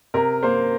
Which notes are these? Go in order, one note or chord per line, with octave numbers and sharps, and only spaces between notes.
C3 A#4
A#3 C5